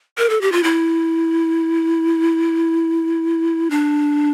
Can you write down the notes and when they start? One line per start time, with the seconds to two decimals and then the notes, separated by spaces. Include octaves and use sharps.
0.18 A#4
0.30 A4
0.41 G4
0.52 F4
0.64 E4
3.71 D4